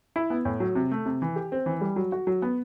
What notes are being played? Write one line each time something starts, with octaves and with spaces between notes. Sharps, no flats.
E4
B3
A2
F#3
C3
A3
C3
E3
G4
C4
E3
G3
F#3
F#4
F#3
B3